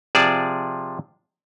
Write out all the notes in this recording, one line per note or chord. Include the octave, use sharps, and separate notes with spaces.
C3 F3 G#4 D5 A5